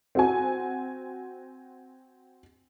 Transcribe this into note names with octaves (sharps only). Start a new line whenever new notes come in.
C4 F#4 G#5